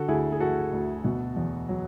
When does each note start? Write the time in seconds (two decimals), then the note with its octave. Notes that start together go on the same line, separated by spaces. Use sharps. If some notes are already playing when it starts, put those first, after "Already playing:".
Already playing: D3 F#4 A4
0.08 D2 E4 G#4
0.32 G#4
0.40 A3 F#4 A4
0.73 D2
1.04 B2
1.36 E2
1.69 F#3